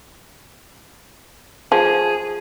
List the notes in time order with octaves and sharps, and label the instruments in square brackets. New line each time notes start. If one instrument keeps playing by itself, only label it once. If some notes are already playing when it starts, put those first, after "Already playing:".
[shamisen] F3 [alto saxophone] G#4